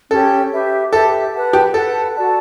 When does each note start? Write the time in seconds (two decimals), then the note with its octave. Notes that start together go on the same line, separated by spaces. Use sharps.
0.11 C#4 G4 A4 C#5
0.52 G4 B4 E5
0.93 G4 A4 B4 E5
1.33 B4 F#5 A5
1.53 G4
1.74 A4 B4 F#5 A5
2.15 F#4 A4 D5 A5